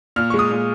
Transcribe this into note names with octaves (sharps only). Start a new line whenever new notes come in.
A#2 F6
G#3 C#6
D#6
A#2